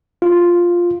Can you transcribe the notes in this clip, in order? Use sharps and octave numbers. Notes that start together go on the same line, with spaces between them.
F4